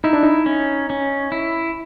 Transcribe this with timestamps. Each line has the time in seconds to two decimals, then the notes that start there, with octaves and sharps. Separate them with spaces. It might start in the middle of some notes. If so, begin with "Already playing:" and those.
0.04 D#4 E4
0.13 D4
0.23 D#4
0.46 C#4
0.90 C#4
1.32 E4